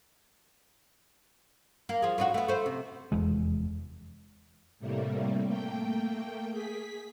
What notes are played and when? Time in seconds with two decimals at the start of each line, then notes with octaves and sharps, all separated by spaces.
1.89 A#3
2.02 F3 G#4
2.18 A2 D#4 F#4
2.34 A3 B3
2.48 A3 C5
2.66 C3
3.12 F1 E2 E3 G#3
4.79 A2 C3 G3 A3 A#3
5.46 A3 A#3 G5
6.50 G#4 B6